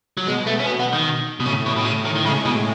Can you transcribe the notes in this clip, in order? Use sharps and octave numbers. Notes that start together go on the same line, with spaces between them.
F#3
B2 G#3
A3
C#4
B3
B3
D#3
B2
A2 C#3
B2
B2
A2 C#3
D#3
D#3
C#3 G#3
B2